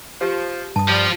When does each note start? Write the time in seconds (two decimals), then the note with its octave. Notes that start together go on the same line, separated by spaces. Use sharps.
0.21 F3 G4
0.76 G2 A5 D#6
0.88 F3 G3